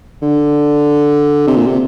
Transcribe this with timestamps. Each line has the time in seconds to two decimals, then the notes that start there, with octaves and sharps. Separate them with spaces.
0.22 D3
1.47 C3
1.57 A#2
1.66 C3